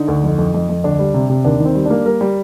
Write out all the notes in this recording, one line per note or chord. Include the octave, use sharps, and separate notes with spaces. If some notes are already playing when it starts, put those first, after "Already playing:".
Already playing: D3 D#4
D2
F2
F2
F2
F2
D2 D4
G3
C3
C3
D#2 D4
D#3 C4
G3
A#3 D4
G3 A#4
G3